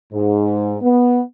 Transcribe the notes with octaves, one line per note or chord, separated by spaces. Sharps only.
G#2
B3